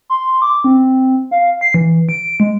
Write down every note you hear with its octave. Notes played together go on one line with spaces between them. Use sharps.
C6
D6
C4
F5
C7
E3
D7
G#3